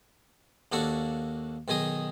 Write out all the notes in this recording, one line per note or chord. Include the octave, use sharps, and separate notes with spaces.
D#2 A#3 D4 F#4 A4 C#6
B1 D#3 D#4 G#4 D#6